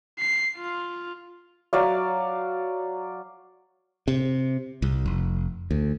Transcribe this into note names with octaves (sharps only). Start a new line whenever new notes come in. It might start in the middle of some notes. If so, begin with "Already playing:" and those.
C7
F4
F#3 D5 F5
C3
C2
F1
D2